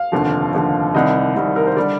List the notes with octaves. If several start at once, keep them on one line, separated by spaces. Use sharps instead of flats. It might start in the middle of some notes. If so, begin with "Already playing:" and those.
Already playing: F5
F1 D#2 D3 F3
F1 D#2 D3 F3
C2 C3 D#3 G3 D#5
C2 C3 D#3 G3
A#4
C5
D3 G3 D5